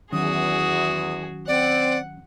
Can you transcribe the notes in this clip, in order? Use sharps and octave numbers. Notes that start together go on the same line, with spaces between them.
E2 D#3 F#3 C#4 F#4 G#4 D#6
C4 D5 F#5